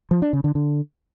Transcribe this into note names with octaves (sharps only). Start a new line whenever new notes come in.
F3
D4
C#3
D3
D3